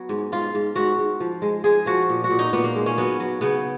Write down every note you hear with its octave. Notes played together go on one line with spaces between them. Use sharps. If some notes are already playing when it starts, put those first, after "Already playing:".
Already playing: F#3 B3
G#2
G#2 F4
G#2
G#2 F#4
G#2
F3
G#3
G#3 G#4
F3 F#4
A#2
F#4
A#2
D#4
A#2 B3
A#3
G#3
C#4
F#3 B3
F#3
C#3 B3